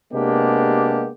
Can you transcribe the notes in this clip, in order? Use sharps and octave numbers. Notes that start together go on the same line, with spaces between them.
C3 G#3 A#3 B3 D4 G4